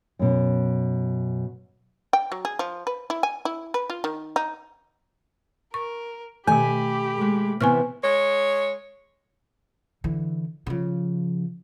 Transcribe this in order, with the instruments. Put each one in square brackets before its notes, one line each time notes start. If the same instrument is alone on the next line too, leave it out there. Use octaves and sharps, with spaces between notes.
[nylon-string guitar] F#2 B2
[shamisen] G5
F#3
G#4
F3
B4
E4
G#5
E4
B4
F4
D#3
D#4
[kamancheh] A#4 [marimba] C#6
[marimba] B2 D#3 [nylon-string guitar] A3 [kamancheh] G4 B5 [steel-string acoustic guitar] G#5
[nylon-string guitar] G#3 A3
[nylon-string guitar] C3 E3 B3 [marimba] G#5 C#6 F6
[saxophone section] G#3 C#5
[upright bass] D3 E3
C#3 F3